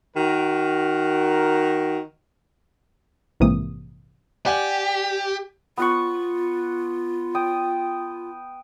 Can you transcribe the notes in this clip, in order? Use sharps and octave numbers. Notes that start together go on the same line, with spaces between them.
D#3 F#4 A#4
A#1 G#2 C3 E3 A#3 D#6
G4 D5 F#5 G#5
B3 F4 F#5 C#6
G5 D#6